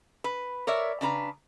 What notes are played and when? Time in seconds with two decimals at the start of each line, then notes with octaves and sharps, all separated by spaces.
0.24 B4
0.67 A#4 C#5 D5 E5
1.01 C#3 D4 B4 A#5